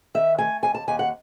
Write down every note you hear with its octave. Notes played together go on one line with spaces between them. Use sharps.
D#3 E5
A3 G#5
D#2 G#5
A5
D#2 G#5
F#5